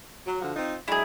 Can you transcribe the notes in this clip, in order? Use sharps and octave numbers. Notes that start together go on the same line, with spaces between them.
F#3
D3 F3 F#4
C4 D#4 F4
F#3 G#3 D4 E4 G#4